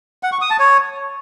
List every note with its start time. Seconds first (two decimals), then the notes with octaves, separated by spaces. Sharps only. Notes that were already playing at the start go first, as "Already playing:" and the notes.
0.23 F#5
0.32 C#6
0.41 D#6
0.50 A5
0.59 C#5